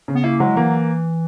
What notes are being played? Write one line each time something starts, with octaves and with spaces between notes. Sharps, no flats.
C#3
B3
A#3 E4
F#3 G#3
E3 A#3